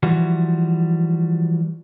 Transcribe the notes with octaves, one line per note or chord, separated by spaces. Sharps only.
E3 F3 G3 F#4